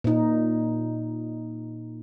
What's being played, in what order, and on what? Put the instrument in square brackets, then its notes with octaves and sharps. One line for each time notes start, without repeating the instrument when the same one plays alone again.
[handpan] A#2 D#4